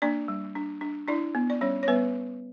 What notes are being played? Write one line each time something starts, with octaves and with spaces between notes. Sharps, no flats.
A#3 D4 D5
G3
D4
D4
D4 E4 D5
B3
D5
G3 C#4 C#5
C#5
G3 B3 B4